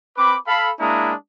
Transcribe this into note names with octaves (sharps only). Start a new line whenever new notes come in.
C4 B4 B5 D6
A4 F5 B5
G#3 A#3 D4 E4 A#5 D#6